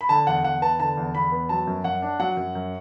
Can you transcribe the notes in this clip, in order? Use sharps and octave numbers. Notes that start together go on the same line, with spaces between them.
B5
D3 A5
E2 F#5
E2 F#5
B3 A5
D3 A5
E2
E2 B5
B3
F#3 A5
F#2
F#2 F#5
D4
F#3 F#5
F#2
F#2